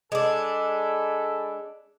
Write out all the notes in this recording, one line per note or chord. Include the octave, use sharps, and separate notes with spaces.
G#3 D4 A4 G#5 B5